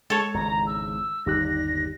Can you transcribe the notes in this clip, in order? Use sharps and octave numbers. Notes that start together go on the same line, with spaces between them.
G#3 A4 C#5
G#1 E2 C#3 A#5
E6
G1 D#2 G3 D#4 G4 F#6 A#6